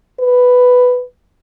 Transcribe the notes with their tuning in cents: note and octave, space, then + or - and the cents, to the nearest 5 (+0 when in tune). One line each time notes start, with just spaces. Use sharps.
B4 +5